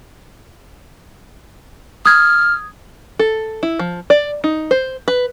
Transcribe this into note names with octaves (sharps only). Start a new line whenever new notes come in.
D#6 F6 G#6
A4
E4
F3
D5
D#4
C5
B4